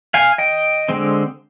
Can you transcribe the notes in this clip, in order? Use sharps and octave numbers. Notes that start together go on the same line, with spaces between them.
F5 G#5
D#5 G5
D3 G#3 C4